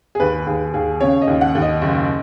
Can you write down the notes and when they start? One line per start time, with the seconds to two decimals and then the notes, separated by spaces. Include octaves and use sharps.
0.15 G#4
0.20 D#2 B4
0.46 D#2 G#4
0.74 D#2 G#4
1.01 C#3 C#5
1.21 D#5
1.27 D#2
1.41 F#5
1.55 D#2
1.62 D#5
1.82 F#1